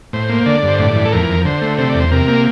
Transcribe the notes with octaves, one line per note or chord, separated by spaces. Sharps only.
A2 C5
A#3
D3 D5
G2
C5
A2 D5
E3
A4
F2 A#4
F2
D3 C5
A3
C3 C5
D5
E2
C5
C3 A#4
A#3